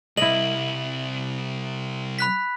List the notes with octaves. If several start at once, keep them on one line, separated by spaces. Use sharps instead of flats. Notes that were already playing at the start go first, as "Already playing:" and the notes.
C2 E4 D#5 F#7
B5 F#6 B6